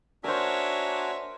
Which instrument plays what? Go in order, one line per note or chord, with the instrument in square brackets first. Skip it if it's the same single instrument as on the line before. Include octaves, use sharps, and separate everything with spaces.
[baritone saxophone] D4 [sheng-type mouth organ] F#4 G#5 A#5 [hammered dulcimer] A#4 C5 [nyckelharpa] C#5 E5